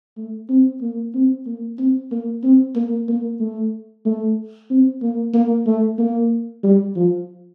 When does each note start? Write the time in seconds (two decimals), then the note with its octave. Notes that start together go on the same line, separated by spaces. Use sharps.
0.17 A3
0.49 C4
0.82 A#3
1.14 C4
1.46 A#3
1.79 C4
2.12 A#3
2.44 C4
2.76 A#3
3.08 A#3
3.40 A3
4.06 A3
4.70 C4
5.02 A#3
5.34 A#3
5.66 A3
5.99 A#3
6.64 G3
6.96 F3